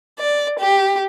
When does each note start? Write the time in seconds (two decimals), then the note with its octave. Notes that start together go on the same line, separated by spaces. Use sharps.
0.18 D5
0.58 G4